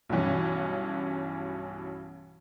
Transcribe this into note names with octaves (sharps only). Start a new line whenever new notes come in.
B1 G2 B2 E3 C#4